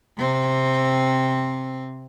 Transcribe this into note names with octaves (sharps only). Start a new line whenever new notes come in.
C3 C4